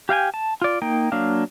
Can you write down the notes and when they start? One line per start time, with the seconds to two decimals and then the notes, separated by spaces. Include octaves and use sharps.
0.09 G4 F5 G5 G#5
0.34 A5
0.62 F4 D5
0.82 A#3 D#4 G5
1.12 F#3 A#3 D4 F5